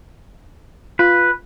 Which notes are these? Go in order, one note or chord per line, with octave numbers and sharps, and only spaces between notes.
F4 B4